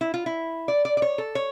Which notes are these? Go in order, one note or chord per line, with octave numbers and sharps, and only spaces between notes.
E4
F4
E4
D5
D5
D5
C#5
A4
C#5